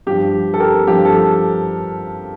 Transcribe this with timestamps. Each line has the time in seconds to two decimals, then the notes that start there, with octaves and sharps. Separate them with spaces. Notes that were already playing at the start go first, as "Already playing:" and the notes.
0.07 G2 F3 G4
0.54 A4
0.60 G4 A#4
0.87 G2 F3 G4
1.05 A4